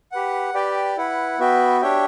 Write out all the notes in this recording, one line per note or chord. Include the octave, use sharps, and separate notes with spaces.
G4 B4 F#5
G4 B4 D5 G5
E4 B4 F#5
B3 F#4 B4 E5 G5
D4 G4 C#5 E5 G5